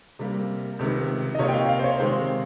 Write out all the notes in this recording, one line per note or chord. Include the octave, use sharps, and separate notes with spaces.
C3 G3 A#3
C#2 C3 D#3
D#5
C3 F3 A#3 F4 C#5
G5
F5
F5
C5
C#5
C3 D#3 G#3 C4 F4 C5